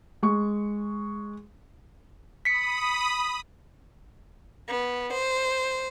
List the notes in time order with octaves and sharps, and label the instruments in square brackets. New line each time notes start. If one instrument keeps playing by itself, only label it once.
[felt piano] G#3 C#6
[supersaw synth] B5 D#6 [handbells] B6 C#7
[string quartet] B3
C5